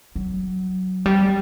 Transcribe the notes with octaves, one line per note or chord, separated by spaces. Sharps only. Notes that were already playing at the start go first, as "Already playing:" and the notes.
F#3
G3